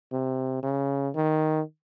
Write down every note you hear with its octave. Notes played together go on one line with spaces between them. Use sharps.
C3
C#3
D#3